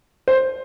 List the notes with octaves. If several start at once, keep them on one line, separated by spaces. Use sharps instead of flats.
C5